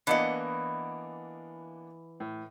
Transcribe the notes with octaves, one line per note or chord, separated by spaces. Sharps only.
E3 A#3 B3 D4 D#5 F#5
A2